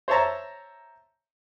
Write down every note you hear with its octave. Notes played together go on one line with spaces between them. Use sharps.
C5 C#5 E5 A5 A#5